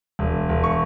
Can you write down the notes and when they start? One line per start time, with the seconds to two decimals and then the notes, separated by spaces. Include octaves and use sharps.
0.19 E1
0.49 E1
0.64 C#6